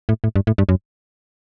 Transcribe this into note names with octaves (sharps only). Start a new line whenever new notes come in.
A2
A2
G2
A2
G2
F#2